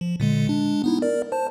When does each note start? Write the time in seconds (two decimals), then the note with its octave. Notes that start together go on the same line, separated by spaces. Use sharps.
0.01 F3
0.20 A#2 D3 G#3
0.47 G#3 D4
0.84 B3 D#4 E4
1.02 A#4 D5
1.32 C5 A5